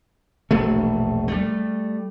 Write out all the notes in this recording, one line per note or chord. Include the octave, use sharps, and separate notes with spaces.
E1 A#1 A3
G3 A3